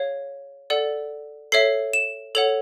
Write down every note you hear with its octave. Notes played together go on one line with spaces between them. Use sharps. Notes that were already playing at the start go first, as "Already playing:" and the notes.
Already playing: G#4 C#5 F5
A4 D5 F#5
A4 C#5 E5 C7
E7
A4 C#5 F#5 F7